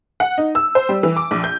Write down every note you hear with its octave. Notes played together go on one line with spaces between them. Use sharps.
F#5
D#4
E6
C5
G3
E3
D6
A#1
G6